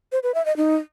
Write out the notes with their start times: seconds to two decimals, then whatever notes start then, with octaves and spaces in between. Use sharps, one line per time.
0.12 C5
0.23 B4
0.34 E5
0.46 D#5
0.57 D#4